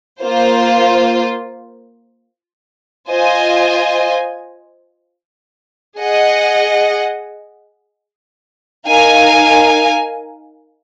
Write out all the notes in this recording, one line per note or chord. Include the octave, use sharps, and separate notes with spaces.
A#3 F4 C5
F4 C5 D#5 G#5
G#4 D#5 F#5
D#4 A#4 F5 G#5